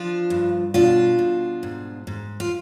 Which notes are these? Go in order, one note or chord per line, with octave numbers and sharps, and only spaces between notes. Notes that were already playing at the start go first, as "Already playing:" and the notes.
Already playing: F3 D4 F4
G2
B2 D4 F4
B2
G#2
G#2
F4